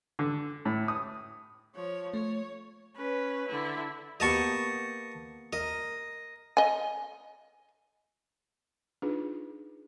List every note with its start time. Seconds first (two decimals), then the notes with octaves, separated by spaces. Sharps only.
0.19 D3
0.65 A2
0.88 D#6
1.75 F3 C#5
2.14 A3 C#5
2.96 C#4 B4
3.48 D3 E4
4.20 A#3 B3 G4 D#5 A5 C#6
5.53 A#4 D#5
6.57 D#5 G#5
9.02 D4 D#4 F4 G#4 B4